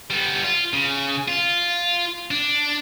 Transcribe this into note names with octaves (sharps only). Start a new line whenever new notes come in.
G3 B3
F4
C#3
F4
D4